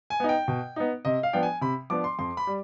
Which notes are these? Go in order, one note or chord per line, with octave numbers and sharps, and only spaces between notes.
G#5
B3 D#4
G5
B2
B3 D#4
C3 D#5
F5
F3 B3 D4 G5
G#5
C3 B5
F3 B3 D4 D6
C6
F2 C6
B5
G3